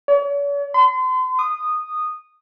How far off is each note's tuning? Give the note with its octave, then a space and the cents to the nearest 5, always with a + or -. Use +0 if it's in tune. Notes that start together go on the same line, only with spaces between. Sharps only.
C#5 +45
C6 -40
D#6 -15